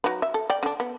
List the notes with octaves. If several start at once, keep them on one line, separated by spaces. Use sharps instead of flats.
F#3 D#4 B4
E5
A4
D5 G5
D3 D4
B3